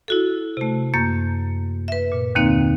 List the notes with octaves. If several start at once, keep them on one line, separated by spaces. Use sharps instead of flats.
E4 F#4 A4
C3 A3
F#2 A#3 G6
B4 E5
A#2
D#2 D3 A#3 C4 D#4 F5